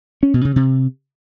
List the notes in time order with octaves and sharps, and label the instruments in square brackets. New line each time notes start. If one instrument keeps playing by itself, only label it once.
[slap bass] C#4
B2
C#3
C3